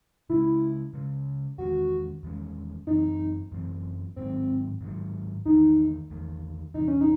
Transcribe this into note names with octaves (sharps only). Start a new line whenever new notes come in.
C#3 G#3 C#4 E4
C#3 G#3 C#4
E2 D#3 G#3 C#4 F#4
E2 D#3 G#3 C#4
F#2 E3 A3 C4 D#4
F#2 E3 A3 C4
G#2 D#3 F#3 C4
G#2 D#3 F#3
E2 D#3 A3 D#4
E2 D#3 A3
E2 C3 E3 D#4
C#4
D#4